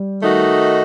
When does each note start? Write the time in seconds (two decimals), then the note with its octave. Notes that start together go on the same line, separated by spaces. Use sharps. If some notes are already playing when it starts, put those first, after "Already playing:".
Already playing: G3
0.21 D#3 A3 D#4 F#4